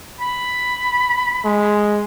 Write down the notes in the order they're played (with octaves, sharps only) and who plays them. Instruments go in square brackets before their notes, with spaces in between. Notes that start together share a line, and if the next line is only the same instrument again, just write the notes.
[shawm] B5
[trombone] G#3